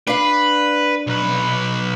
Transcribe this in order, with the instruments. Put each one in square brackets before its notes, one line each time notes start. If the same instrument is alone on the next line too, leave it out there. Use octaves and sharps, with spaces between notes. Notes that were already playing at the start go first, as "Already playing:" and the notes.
[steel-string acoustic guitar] D4 F5 [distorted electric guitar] B4
[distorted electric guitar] B1 B4